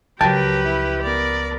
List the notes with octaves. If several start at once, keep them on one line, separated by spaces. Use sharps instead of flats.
C#2 F3 F#3 G4 A#4 B4 G5 A5
E4
B3 A#4 D5